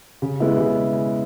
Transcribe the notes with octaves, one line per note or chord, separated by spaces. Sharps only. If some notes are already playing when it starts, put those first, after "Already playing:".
C#3
G#3 B3 E4
C#3